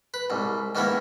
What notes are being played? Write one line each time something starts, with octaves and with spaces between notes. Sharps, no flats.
B4
C2 G#2
G#2 D#3 A#3 B3 C#4 E4